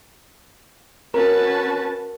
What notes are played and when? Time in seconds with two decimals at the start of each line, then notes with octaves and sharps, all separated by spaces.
1.14 C#4 F#4 A#4 B4 A5